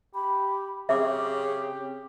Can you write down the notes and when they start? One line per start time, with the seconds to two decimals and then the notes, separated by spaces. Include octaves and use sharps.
0.15 G4 B5
0.89 C#3 C4 G4 E5 D6